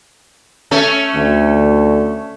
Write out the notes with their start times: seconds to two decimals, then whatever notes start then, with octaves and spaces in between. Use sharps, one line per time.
0.71 A3 C#4 A4
1.15 D2